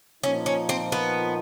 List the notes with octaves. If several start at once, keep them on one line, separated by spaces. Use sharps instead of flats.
A#2 F3 A#3 C#4 D#4
C#4
C4
B3